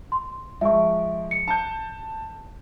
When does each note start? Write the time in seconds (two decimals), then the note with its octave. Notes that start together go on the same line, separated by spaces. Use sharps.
0.12 C6
0.61 F3 G#3 E5 C#6
1.31 C#7
1.48 A5 G6